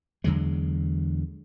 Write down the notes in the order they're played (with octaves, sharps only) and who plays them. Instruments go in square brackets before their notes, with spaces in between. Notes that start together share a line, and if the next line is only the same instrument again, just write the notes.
[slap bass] E2 D3 F#3 G#3